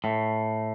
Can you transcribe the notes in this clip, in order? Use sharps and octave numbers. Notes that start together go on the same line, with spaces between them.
A2